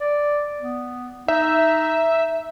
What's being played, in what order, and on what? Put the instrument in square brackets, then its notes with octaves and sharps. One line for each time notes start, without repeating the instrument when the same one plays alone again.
[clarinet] D5
B3
[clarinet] D#4 [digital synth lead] E5